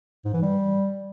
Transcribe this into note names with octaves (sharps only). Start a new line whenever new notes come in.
G#2
E3
G3